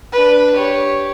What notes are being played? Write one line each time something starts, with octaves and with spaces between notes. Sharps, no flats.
D4 B4
G4 C#5